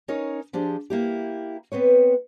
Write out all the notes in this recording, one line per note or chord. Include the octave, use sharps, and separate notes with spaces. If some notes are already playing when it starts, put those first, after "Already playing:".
C#4 D#4 A#4 C#5
F3 D4 G4 G#4 C5
A#3 E4 G4
B3 C4 B4 C#5